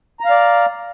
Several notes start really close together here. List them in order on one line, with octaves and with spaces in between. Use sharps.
A#5 F5 D5